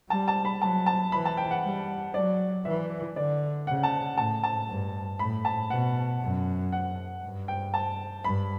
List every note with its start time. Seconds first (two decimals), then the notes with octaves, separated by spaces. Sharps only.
0.10 G3 A5
0.28 A5
0.45 B5
0.61 F#3 A5
0.86 A5
1.12 E3 B5
1.25 A5
1.37 G5
1.51 F#5
1.63 G3
2.14 F#3 D5
2.65 E3 E5
3.16 D3 D5
3.67 C#3 F#5
3.83 A5
4.17 A2 A5
4.44 A5
4.68 G2
5.19 A2 B5
5.45 A5
5.70 B2 F#5
6.22 F#2
6.72 F#5
7.23 G2
7.48 G5
7.74 A5
8.24 G2 B5